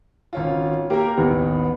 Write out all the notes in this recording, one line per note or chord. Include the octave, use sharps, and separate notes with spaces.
G#1 C#4 F4
A#3 G4 A#4
A1 D#2 B3